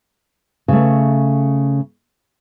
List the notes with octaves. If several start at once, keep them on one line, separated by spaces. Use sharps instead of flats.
C#3 A3